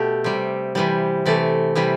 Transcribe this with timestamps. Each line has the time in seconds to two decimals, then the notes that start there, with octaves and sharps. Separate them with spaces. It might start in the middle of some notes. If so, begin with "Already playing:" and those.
Already playing: B2 A3 G4
0.24 C3 G3
0.75 C3 E3 G3
1.26 C3 E3 A3 D5
1.75 C3 E3 G3